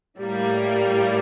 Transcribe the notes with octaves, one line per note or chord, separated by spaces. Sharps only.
A2 G3 A#3